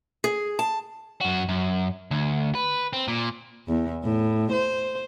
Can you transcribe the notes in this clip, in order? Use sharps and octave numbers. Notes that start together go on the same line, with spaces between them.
G#4
A5
F#2 F#4
F#2
D2
B4
C4
A#2
E2
A2
C5